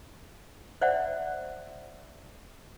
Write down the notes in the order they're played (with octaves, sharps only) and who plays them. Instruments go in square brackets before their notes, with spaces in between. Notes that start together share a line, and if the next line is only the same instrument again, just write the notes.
[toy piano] C5 D5 E5 F#5